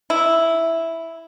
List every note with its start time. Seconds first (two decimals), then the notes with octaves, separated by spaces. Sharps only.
0.10 E4